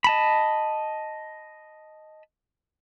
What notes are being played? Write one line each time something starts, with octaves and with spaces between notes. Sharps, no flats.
D#5 A5 B5